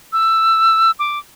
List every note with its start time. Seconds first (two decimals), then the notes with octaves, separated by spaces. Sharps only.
0.13 E6
0.99 D6